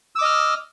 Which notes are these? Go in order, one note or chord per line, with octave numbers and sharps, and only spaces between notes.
D#5 D6 E6 F6